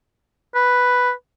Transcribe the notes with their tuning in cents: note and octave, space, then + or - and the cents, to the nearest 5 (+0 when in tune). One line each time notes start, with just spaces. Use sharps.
B4 +0